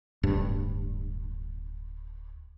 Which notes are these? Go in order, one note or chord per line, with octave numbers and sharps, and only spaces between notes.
D1 G2